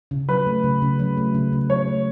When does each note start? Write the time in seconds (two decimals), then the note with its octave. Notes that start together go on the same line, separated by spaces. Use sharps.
0.11 C#3
0.29 F#3 B4
0.47 A3
0.64 C#3
0.82 C#3
0.99 F#3
1.17 A3
1.35 C#3
1.53 C#3
1.70 F#3 C#5
1.88 A3